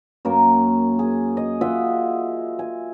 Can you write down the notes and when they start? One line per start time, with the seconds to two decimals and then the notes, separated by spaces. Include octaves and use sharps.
0.25 F#2 A#3 A#4
0.99 G#4
1.37 D#5
1.61 F4 D#5 E5 F#5
2.59 G#5